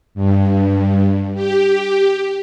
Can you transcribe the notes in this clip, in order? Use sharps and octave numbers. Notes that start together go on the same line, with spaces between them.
G2
G4